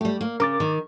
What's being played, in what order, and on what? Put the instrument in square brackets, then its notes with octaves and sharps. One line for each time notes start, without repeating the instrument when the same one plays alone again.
[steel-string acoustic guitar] G3 G4 [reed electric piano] A3
[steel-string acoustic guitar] A#3
[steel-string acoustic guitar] C#3 [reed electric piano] A#4 D6 A6
[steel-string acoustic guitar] D#3